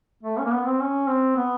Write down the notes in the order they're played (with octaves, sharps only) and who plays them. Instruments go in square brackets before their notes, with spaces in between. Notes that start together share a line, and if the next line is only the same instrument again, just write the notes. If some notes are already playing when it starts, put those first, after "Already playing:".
[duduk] A3
C#4
A#3
B3
C4
C#4
C4
B3